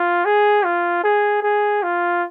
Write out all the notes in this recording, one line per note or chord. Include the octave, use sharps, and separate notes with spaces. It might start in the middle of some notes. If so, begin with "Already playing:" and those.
Already playing: F4
G#4
F4
G#4
G#4
F4